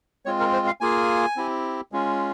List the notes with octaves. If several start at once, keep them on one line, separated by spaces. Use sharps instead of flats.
G#3 C4 F4 C#5
A#4
C5
F5
A#3 F4 G#4 G#5
C4 E4 G4
G#3 C#4 F4